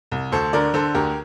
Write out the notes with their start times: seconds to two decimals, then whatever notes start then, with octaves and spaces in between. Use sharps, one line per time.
0.12 C2
0.32 D2 A4 C5
0.53 D3 A#4 D5
0.74 D3 A4 C5
0.94 D2 G4 A#4